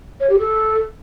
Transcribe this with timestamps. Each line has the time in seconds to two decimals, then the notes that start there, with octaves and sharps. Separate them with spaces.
0.20 C#5
0.30 G4
0.39 A4